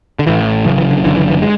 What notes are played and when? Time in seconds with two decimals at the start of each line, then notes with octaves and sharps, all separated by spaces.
0.19 D3
0.27 A1 A2 E3
0.65 F#1 F#2 C#3 E3
0.78 E3
0.91 D3
1.03 F#1 F#2 D3 E3
1.17 E3
1.30 E3
1.42 G#3